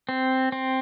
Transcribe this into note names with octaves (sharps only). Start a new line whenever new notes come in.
C4
C4